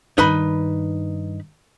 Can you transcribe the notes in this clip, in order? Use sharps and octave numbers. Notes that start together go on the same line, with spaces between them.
G2 D#3 D#4 B4 B5